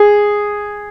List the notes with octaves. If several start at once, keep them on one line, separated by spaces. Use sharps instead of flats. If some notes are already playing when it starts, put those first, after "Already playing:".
Already playing: G#4